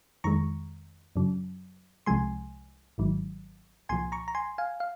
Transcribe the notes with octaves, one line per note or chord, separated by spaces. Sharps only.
F2 D#3 G#3 A#5 C#6
F#2 C#3 F#3
C2 C3 F3 G#3 G#5 C6
G#1 G#2 D#3 F#3
C2 A#2 F3 G#5 C6
A#5 C#6
A#5
G#5 C6
F5 G#5
F5